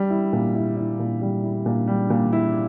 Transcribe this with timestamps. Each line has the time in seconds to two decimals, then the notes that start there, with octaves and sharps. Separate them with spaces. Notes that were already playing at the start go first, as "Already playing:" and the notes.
Already playing: G3
0.10 E4
0.33 A#2
0.55 E4
0.77 E4
0.99 A#2
1.21 G3
1.43 E4
1.66 A#2
1.87 G3
2.10 A#2
2.33 E4